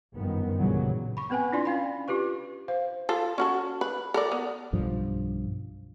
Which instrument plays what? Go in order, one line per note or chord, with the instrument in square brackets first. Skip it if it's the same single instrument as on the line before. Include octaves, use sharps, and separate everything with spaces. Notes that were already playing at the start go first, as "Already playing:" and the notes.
[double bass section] G1 F#2 D#3 F3 B3
A#1 C#3 E3 F#3 G3 B3
[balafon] B5 C#6
B3 C4 B4 F#5 G#5
D4 E4 F4 D5 C6
C#4 F5 B5
F4 G4 B4 C#6
C5 F5
[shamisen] F4 A4
C#4 F#4 A4
B4
A4 A#4 D5
B3
[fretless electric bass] B1 G2 F3